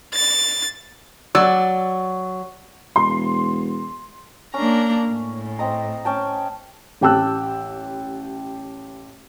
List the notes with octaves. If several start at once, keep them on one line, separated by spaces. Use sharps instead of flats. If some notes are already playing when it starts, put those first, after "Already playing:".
A6
F#3 D5 E6
E1 C6
A#3 C#4 D4 A#5
A2
C4 D#5 A#5
C#4 G5 A5
A1 G4 G5 A5 E6 F#6